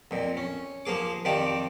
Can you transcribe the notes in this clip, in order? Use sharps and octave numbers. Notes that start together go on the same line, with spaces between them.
F2 A#2
C#4
F3 A#3 G#4 D6
F2 D#3 F3 G4 D5 D6